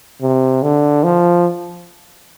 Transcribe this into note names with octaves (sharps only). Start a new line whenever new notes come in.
C3
D3
F3